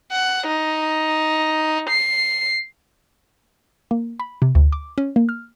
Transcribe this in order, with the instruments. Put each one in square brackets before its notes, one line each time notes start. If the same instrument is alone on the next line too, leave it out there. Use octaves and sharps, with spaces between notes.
[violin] F#5
D#4
C7
[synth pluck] A#3
B5
C3
D2
D6
C#4
A#3
F6